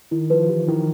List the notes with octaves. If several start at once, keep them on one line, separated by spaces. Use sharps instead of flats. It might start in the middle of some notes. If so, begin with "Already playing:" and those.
D#3 E4
F3 B4
E3 G4
D#3 E4